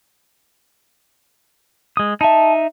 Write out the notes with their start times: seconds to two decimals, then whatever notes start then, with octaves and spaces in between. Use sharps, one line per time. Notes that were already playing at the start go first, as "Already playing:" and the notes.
1.97 G#3 D#6
2.21 D#4 E5 A5